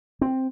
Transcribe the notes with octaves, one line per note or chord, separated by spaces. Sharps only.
C4